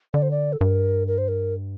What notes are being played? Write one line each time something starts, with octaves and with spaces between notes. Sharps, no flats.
D3 D5
C5
D5
A4
G2 A#4
A#4
C5
A#4